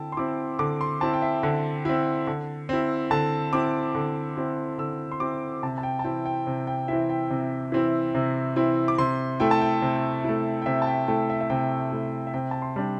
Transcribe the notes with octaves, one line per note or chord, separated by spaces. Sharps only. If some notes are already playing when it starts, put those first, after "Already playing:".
Already playing: D3 C4 E4 G5 A5
C6
C4 E4 D6
D3 D6
C6
C4 E4 A5
G5
E5
D3
C4 E4
D3
C4 E4
D3 A5
C4 E4 D6
D3
C4 E4
D3 E6
C6
C4 E4 D6
C3 A5
A5
G5
A5
E3 C4 E4 G5
G5
C3
G5
E3 C4 E4 E5
G5
C3
E3 C4 E4
C3
E3 C4 E4
D6
C3 C6
A3 E4 G5
A5
G5
C3
A3 E4
G5
C3 E5
A5
G5
A3 E4 G5
E5
E5
C3 G5
A3 E4
E5
C3 G5
A5
C6
G3 D4